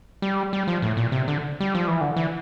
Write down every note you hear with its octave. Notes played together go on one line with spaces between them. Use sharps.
G3
G3
F3
A2
A#2
C3
D3
G3
F3
E3
D3
E3